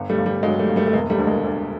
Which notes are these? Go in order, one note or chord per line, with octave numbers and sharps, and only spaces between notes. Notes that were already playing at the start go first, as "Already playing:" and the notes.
Already playing: G1
G3 A3
G1
G3
G1 F#3 G#3
G3 A3
G1
G3 A3
A3
E1 G#3 A#3
G3 A3
D2
G#3 A#3
D2